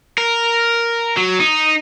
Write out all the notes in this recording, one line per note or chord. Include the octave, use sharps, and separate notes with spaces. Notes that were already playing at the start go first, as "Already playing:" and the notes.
A#4
F#3
D#4